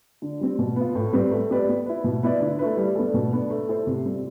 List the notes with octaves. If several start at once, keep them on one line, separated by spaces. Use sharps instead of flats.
D3
G3 C4
B2
B3 F4
A2
G3 C4 G4 B4
A3
C4 G4 B4 D5
B3
E4 B4
B2
B3 E4 B4 D5
D3
A3 E4 B4
G3
B3 D4 A4
B2
B3 D4
A3
E4 A4 C5
C3
G3 C4